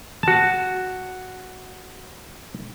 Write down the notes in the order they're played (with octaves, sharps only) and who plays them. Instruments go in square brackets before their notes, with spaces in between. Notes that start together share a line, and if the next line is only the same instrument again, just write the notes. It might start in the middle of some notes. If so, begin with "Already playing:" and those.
[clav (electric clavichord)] F#4 A5